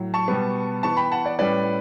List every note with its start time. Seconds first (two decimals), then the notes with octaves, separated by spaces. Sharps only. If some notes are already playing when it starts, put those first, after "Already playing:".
Already playing: A2 F#3
0.14 A5 C#6
0.28 B2 G3 B3
0.83 E3 B3 A5 C#6
0.97 G5 B5
1.11 F#5 A5
1.25 D5 F#5
1.39 A2 G3 C#4 B4 D5